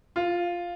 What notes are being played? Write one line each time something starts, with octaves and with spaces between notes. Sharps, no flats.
F4